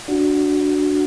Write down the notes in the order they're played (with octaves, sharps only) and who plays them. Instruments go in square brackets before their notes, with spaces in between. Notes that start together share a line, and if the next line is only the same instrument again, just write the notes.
[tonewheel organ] D4 F#4